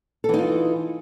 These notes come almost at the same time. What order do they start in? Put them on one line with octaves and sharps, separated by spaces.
A4 E3 D#4 F4